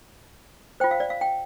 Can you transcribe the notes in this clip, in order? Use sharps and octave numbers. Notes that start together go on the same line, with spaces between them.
F4 C5 G5
F5
D5
F5
G5